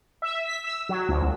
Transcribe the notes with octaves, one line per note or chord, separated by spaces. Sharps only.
E5
B6
E6
F#3
D2
C2